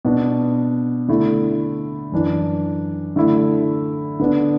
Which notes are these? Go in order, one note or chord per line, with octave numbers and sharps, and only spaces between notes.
B2 B3 D4
D3 A3 E4
F#2 E3 D4
D3 A3 E4
D3 B3 D4